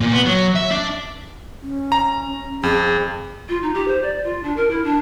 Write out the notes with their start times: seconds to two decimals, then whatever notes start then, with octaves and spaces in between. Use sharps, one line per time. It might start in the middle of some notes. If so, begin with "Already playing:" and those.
0.01 A#2
0.12 B3
0.26 F#3
0.56 E5
0.71 D4
1.62 C#4
1.92 A#5
2.63 F2 G#4
3.49 F4
3.62 D#4
3.74 G4
3.88 C5
4.02 D5
4.24 F4
4.43 D4
4.56 A#4
4.71 E4
4.84 D4